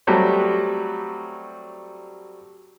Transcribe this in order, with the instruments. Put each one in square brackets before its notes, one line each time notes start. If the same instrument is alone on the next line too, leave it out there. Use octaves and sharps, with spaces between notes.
[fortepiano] F#3 G3 A3 C4